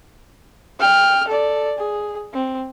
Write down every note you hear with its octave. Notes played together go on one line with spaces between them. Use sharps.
G5 F6
A4 D5
G#4
C4